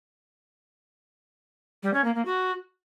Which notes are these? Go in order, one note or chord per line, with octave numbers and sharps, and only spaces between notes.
G3
C#4
A#3
A#3
F#4